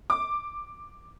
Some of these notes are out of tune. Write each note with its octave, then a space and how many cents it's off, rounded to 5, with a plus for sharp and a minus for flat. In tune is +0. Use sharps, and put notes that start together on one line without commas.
D6 +5